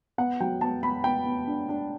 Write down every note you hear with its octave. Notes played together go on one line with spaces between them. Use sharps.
B3 F#5
F#3 G5
B3 A5
B3 B5
B3 G5
B3
D4
D4